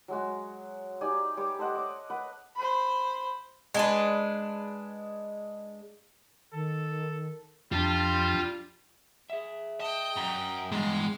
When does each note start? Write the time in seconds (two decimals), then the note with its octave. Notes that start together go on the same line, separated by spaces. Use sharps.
0.08 F#3 G#3 F#4
1.01 D#4 G4 D5 G#5
1.37 G3 G4 C#5 D6
1.59 A4 C5 D#5 F#5
1.75 C#5 D#5 D6
2.10 B4 F#5
2.56 C5 B5
3.74 G#3 D4 B4
6.53 D#3 A4
7.72 F2 G3 D4 F4 A5
9.30 G#4 E5
9.80 D#5 G5 A5
10.17 F#2 A#5
10.72 E2 G2 G#3 F5